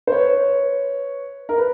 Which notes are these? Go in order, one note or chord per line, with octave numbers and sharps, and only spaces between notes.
C5
B4 C#5
A#4
B4